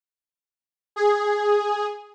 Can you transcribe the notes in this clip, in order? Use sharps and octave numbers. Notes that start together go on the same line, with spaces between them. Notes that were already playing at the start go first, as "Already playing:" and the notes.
G#4